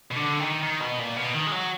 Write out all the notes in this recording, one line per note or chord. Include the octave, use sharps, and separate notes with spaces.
B2
D3
D#3
D#3
B2
A#2
B2
D#3
G#3
F#3